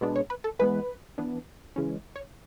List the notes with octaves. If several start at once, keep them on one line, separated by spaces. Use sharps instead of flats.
B2 G#3 B3 D4
C#5
B4
A4
E3 G#3 B3 B4
E3 B3 D4
C#3 E3 G#3 C#4
C#5